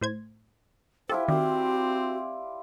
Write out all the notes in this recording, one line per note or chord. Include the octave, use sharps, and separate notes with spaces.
A2 C5 G#6
E4 F4 G4 A4 C5
D#3 C4 F#4 D5